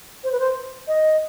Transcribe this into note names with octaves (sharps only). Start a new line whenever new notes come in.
C5
B4
C5
D#5